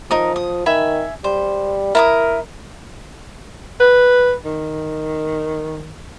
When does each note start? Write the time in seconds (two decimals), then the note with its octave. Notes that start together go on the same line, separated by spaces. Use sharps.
0.11 F3 D#4 A#4 D#6
0.36 D#6
0.66 D#3 E5 G#5 B5
1.24 G3 C5
1.95 E4 A#4 A#5 D#6
3.80 B4
4.45 D#3